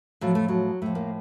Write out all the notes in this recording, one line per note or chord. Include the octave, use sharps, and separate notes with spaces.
A2 F3 F#3
A3
F#3
A2 F3 A3
A#3